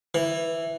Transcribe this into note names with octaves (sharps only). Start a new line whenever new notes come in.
E3